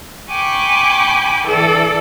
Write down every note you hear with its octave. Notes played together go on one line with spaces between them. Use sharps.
G5 G#5 B5 C#6 D6 G6
E3 A4 D5